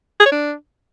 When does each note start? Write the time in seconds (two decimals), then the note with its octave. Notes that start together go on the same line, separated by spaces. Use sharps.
0.20 G#4
0.26 C#5
0.32 D4